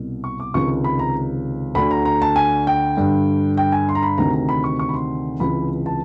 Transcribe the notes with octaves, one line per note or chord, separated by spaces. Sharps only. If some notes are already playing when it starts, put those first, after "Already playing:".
Already playing: C2 B2
C#6
D6
C#2 C3 D#3 C#6
B5
A#5
D2 D3 B5
A#5
A#5
A5
G#5
G5
G2 D3
G5
G#5
C6
A#5
B5
D2 C3 D#3 A#5
A#5
B5
C#6
C#6
B5
C6
C#2 C3 E3 B5
A5